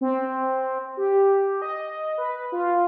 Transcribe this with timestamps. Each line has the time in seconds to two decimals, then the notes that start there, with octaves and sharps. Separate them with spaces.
0.01 C4
0.97 G4
1.62 D#5
2.18 B4
2.52 F4